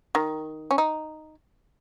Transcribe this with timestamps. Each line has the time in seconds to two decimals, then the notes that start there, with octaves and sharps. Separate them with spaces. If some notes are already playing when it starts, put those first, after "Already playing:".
0.15 D#3
0.71 C#4
0.78 D#4